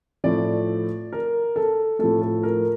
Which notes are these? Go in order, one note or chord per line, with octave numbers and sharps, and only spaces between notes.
A2 F3 A3 D5
A#4
A4
A2 F3 A3 A4
A4
A#4